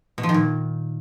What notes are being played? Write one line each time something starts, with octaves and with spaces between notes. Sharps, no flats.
B2
F3
D#3
A#2